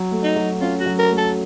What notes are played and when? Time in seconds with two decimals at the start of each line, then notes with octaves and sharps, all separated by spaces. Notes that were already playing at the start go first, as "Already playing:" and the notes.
Already playing: F#3
0.11 A3
0.23 D#4
0.36 F#3
0.61 C#4 F4
0.80 F#4
0.86 F#3
0.99 A#4
1.10 A3
1.17 A4